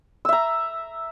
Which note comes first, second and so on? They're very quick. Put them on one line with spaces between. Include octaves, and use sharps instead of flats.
E6 E5 A#5